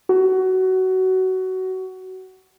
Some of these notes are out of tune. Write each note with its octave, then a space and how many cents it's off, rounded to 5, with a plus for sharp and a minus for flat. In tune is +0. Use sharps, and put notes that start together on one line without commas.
F#4 +20